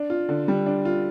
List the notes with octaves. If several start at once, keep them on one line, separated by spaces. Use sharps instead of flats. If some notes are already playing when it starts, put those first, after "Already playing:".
Already playing: D4
F4
D3
G3
D4
F4